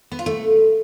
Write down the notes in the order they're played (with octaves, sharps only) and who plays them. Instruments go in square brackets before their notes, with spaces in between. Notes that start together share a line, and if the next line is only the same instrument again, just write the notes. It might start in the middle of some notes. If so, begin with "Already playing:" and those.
[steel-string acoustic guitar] B3
F4
A3